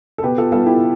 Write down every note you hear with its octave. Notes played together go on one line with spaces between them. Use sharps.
A4
B2 G4 B4
F4 A4
G3 B3 F4 A4
E4 G4